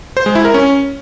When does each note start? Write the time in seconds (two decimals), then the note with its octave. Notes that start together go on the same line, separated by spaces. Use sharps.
0.17 C5
0.26 G#3
0.35 E4
0.45 A#4
0.54 C#4